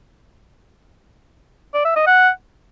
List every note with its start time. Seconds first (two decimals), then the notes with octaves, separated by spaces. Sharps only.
1.74 D5
1.85 E5
1.96 D#5
2.07 F#5